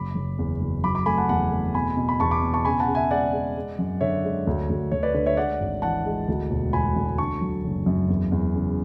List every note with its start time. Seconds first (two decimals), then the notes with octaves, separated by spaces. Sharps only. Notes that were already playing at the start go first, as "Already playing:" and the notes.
Already playing: F#1 B5 D6
0.15 F#1
0.39 E2
0.61 F#1
0.84 F#3 B5 D6
0.95 B5 D6
1.06 A3 G#5 B5
1.18 F#5 A5
1.29 E2 F#5 A5
1.52 A3
1.74 B2 G#5 B5
1.97 B2
2.09 B5
2.20 E2 A5 C#6
2.31 B5 D6
2.42 B2
2.54 A5 C#6
2.65 C#3 G#5 B5
2.80 F#5 A5
2.88 C#3
2.95 E5 G#5
3.11 G#3 D5 F#5
3.33 G#3
3.56 G#3
3.79 F#2
4.01 D3 C#5 E5
4.24 G#3
4.47 D2
4.70 D2
4.92 D2 C#5
5.03 B4 D5
5.14 D3 B4
5.26 C#5 E5
5.37 G#3 D5 F#5
5.60 G#1
5.82 E3 F#5 A5
6.06 G#3
6.28 D2
6.50 E1
6.73 E1 G#5 B5
6.96 D2
7.18 D3 A5 C#6
7.41 F#3
7.64 F#1
7.86 F#2
8.09 E2
8.32 E2
8.55 C#3